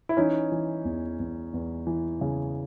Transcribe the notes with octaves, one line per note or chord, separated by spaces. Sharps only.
E4
E3 C#4 D#4
E3
E2
E2
E2
E3
C#3